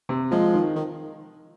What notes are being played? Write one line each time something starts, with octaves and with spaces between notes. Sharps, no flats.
C3
F3 G#3
D#3
D#3